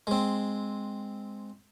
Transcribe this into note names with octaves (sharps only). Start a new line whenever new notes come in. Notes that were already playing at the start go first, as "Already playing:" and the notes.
G#3 C4